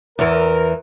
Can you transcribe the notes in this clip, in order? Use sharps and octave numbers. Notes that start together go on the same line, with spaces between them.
E2 E3 A#4